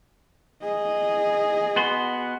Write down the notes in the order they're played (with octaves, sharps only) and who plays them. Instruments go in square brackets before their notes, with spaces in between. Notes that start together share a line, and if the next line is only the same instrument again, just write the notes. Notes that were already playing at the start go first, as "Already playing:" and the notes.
[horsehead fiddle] G#4 D#5
[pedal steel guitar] B3 F#4 C6